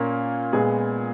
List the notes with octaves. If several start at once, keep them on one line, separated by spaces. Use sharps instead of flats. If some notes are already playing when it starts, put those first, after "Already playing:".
Already playing: A#2 A#3 C#4 A#4
A#2 G#3 B3 G#4